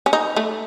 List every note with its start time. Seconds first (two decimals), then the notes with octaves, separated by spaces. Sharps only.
0.06 C#4
0.13 D#4
0.36 A3